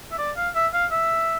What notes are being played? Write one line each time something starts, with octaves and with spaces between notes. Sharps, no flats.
E5
D5
F5
E5
F5
E5